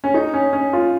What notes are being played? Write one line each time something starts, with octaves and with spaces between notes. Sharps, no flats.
C#4
D#4
C#4
C#4
F4